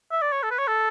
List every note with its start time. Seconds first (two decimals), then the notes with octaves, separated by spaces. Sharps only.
0.11 E5
0.22 D5
0.32 C#5
0.43 A4
0.51 B4
0.59 C#5
0.67 A4